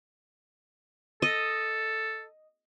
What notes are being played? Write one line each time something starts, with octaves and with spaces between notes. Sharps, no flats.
A4 D#5